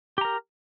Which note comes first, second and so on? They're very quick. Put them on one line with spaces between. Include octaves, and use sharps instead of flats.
G4 A#5 A#4